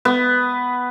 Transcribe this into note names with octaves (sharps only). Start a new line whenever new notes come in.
B3